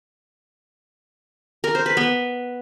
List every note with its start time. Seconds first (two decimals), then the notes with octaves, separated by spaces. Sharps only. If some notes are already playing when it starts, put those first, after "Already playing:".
1.64 A#4
1.75 C5
1.86 B4
1.97 B3